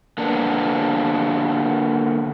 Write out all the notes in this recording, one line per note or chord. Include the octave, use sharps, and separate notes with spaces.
D3 A#3 B3 D4